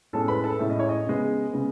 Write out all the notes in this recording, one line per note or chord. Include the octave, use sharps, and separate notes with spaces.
A2 G#3 C#4 A4 A5
B4 B5
A4 A5
A2 G#3 C#4 E5
D#5
C#5
D#5
C#3 G#3 B3
C#3 G#3 B3